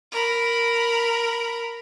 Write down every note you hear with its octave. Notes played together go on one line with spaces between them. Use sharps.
A#4 B5